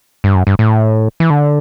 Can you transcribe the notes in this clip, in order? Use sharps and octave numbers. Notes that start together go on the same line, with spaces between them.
G2
F#2
G2
A2
E3
D3